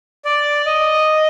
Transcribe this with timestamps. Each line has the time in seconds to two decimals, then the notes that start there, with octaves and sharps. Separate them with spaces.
0.25 D5
0.66 D#5